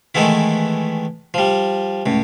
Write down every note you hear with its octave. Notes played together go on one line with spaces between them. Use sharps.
D#3 E3 G#3 A3 B3 E4
F3 G3
C#2 A2